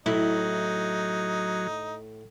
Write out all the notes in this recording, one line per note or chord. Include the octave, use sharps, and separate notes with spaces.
A2 F#3 D#4 E4